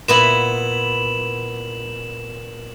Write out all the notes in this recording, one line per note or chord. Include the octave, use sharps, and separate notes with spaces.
A#2 B3 E4 E7 F#7